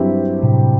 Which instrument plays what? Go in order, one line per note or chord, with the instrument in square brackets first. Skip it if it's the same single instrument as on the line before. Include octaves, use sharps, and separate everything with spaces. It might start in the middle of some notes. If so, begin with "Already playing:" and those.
Already playing: [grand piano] G2 F#3 C4 E4 G4
[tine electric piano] A2 C3